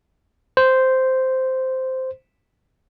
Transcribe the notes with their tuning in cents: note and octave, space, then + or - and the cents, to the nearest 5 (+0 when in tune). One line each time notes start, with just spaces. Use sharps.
C5 -5